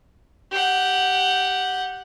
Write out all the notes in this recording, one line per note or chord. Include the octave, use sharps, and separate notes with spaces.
G4 F#5